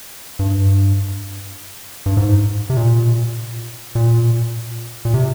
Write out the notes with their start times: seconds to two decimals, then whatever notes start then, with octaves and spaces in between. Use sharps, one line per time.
0.39 G2
2.06 G2
2.17 G#2
2.70 C3
2.77 A#2
3.95 A#2
5.05 A#2
5.14 C3